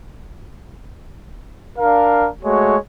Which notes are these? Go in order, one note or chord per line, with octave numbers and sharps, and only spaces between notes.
D4 A#4 F5
G#3 A3 F#4 C#5